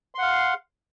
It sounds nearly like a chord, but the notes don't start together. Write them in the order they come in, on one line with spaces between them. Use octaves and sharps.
C6 F#5 F5